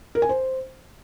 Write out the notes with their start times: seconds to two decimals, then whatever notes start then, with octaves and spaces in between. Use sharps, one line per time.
0.15 A#4
0.22 G#5
0.29 C5